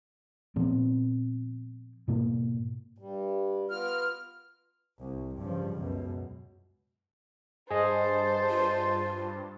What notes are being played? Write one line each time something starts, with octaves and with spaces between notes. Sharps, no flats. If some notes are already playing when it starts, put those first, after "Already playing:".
A#2 F3 B3 C4
G#2 B2 A#3
G2 G3
B3 F4 F6
C2
G2 C#3 F3
C#2 F#2 B2
G2 G#4 C5 D#5 A5
F4